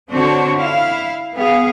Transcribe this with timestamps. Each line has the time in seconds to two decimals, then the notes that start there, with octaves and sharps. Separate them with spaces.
0.11 D3 C4 D4 F#4 C#5
0.57 E4 F5
1.36 B3 G#4 F5